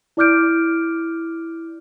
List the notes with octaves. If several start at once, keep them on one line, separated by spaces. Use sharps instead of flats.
E4 D5 D6 F6 G6 D7